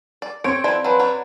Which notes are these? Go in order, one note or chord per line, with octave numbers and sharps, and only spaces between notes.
D5
C4 C#5 D7
F3 E4 B4 D5
F3 F#3 B4
F#3 D4 C#5